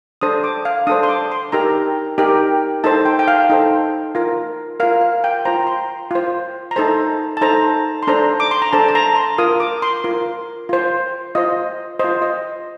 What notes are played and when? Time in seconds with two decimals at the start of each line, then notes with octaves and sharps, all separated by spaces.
0.21 D4 A4 C5 D#6
0.44 D6
0.65 F5
0.87 D4 A4 C5 D#6
1.03 C6
1.09 D6
1.32 C6
1.52 D#4 G4 A#4 A#5
2.18 D#4 G4 A#4
2.84 D#4 A4 C5 A5
3.05 G5
3.19 G5
3.28 F5
3.50 D#4 A4 C5
4.15 F4 A#4
4.80 A#4 F5
4.83 F4
5.01 F5
5.24 G5
5.45 F4 C5 A#5
5.67 C6
6.11 F4 C5
6.71 A#5
6.76 D#4 A4 C5 A5
7.37 A5
7.41 D#4 A4 C5 A#5
8.03 C6
8.07 D4 A4 C5 A#5
8.40 D6
8.51 C6
8.62 A#5
8.73 D4 A4 C5 A5
8.88 A5
8.95 A#5
9.16 C6
9.38 F4 A#4 D#6
9.60 D6
9.82 C6
10.04 F4 A#4
10.69 F4 C5
11.35 F4 C5 D#5
11.99 F4 C5 D#5
12.22 D#5